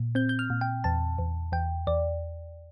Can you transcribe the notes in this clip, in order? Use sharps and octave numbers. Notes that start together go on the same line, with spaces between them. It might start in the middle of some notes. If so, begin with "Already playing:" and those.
Already playing: A#2
C4 G6
G6
F6
A#2
G5
E2 A5
E2
E2 G5
E2 D5